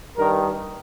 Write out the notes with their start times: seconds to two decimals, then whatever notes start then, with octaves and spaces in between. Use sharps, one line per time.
0.17 G2 D#3 A#4